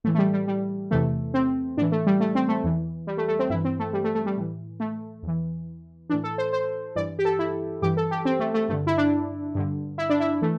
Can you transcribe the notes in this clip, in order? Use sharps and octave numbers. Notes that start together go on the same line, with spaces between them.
A2 E3 A3
A3
G3
G3
G3
E2 C3 E3 A3
C4
A2 E3 D4
A3
G3
A3
C4
A3
E2 E3
G3
A3
A3
C4
G2 E3 E4
C4
A3
G3
A3
A3
G3
A2 E3
A3
E2 E3
A2 E3 D4
A4
C5
C5
G2 E3 D5
G4
A4
E4
G2 E3 G4
A4
G4
C4
A3
A3
G2 D3 A3
E4
D4
G2 D3
E4
D4
E4
E3 A3